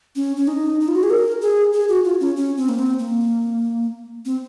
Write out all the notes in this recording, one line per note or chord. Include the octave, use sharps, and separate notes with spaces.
C#4
C#4
D#4
D#4
F4
F#4
G#4
A#4
G#4
G#4
F#4
F4
C#4
C#4
C4
A#3
C4
A#3
C4